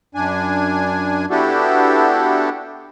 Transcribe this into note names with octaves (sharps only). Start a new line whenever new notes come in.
F#2 D4 G#5
B3 D4 E4 F#4 G4 A4